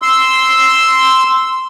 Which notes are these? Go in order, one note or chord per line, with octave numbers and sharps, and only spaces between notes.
C6 E6